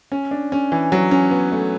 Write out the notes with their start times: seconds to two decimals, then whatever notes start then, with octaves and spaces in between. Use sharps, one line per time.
0.12 C#4
0.31 D4
0.52 C#4
0.72 E3
0.92 F#3
1.11 C#4
1.31 B3
1.52 A3